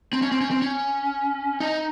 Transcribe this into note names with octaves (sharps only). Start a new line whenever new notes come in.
C4
C#4
C4
C#4
C4
C#4
D#4